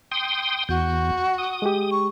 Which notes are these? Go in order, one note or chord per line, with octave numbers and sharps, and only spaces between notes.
G5 C6 D#6
E2 F#4 G6
D#6
G#3 G4
C#6